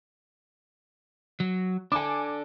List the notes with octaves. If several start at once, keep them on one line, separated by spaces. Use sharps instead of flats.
F#3
D4 A4 G#5 D6